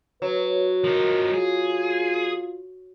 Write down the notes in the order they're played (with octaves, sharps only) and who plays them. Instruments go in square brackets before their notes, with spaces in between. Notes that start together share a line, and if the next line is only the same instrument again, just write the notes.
[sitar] F#3 [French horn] B4
[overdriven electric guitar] F3 D#4 [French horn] A#4
[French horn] F4 [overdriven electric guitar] G#4